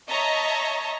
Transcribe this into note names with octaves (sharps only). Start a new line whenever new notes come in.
C#5 D#5 E5 A5 A#5 C#6